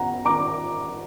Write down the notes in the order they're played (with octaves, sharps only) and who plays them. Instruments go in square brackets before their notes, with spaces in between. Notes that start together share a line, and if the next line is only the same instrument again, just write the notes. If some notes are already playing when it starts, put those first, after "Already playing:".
Already playing: [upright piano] F#5 A#5
A#5 D6